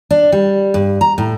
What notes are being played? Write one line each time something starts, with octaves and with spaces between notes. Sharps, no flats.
D4
G3
G2
A#5
A2